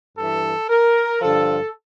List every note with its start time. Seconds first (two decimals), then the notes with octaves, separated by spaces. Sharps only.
0.17 G2 E3 A4
0.69 A#4
1.21 G2 D3 F3 A4